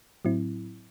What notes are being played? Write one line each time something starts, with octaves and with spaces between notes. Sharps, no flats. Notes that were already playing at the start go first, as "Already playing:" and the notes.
A2 F#3 C4 E4